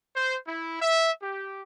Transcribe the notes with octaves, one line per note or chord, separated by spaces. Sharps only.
C5
E4
E5
G4